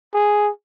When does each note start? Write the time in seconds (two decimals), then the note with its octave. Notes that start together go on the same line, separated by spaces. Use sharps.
0.14 G#4